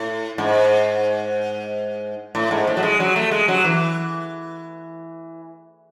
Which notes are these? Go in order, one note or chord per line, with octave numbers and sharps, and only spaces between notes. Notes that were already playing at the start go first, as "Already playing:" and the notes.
Already playing: A2
G#2
A2
G#2
A2
F#3
G#3
F#3
A3
G#3
F#3
E3